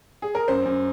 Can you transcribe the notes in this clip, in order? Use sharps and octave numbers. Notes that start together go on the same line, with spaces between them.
G#4
A#4
F#2 C5
F#2